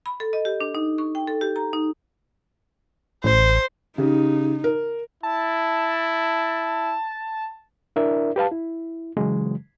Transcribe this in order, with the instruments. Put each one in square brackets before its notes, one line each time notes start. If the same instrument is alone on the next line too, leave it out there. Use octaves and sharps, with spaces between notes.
[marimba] B5
A4
D#5
G4
D4
D#4
C#6
G5
A4
G4
A#5
D#4
[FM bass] A1 [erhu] C5
[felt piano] C#3 G4 [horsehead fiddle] D#4
[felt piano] A#4
[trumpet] E4 [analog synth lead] A5
[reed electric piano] D4 E4 A#4 D5 E5
G4 B4 F5 A5
E4
C#3 E3 F#3 G#3